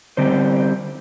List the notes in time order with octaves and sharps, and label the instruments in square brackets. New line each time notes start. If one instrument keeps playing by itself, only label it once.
[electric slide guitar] D3 G3 C4 G4 C5